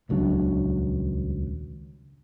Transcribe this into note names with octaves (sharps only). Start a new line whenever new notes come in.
D#1 C#2 F#3 D4